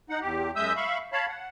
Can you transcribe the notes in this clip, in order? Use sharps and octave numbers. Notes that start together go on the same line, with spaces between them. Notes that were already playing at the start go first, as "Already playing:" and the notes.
D#4 F#5
E2 G4
F#2 G#3 E5 D#6 E6 G6
E5 F5 B5 C#6
C#5 F5 A5 B5
F#5